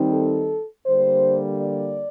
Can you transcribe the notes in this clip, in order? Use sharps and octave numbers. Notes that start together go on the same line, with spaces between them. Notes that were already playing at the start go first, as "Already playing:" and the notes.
Already playing: D#3 G3 C4 D#4
A4
D3 G3 A#3 C5
D5